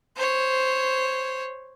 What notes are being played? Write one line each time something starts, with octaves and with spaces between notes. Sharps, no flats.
C5 C#5